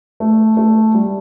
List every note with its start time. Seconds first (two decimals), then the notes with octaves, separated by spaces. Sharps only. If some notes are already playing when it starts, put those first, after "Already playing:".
0.20 A3
0.57 A3
0.94 G3